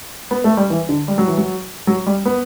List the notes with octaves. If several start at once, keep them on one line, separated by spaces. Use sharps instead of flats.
B3
A3
G3
E3
D3
G3
F#3
E3
F#3
F#3
G3
B3